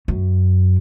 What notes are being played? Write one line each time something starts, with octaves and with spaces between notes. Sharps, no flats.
F#2